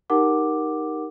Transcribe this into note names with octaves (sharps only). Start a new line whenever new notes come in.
D#4 G4 A#4 F#5 D6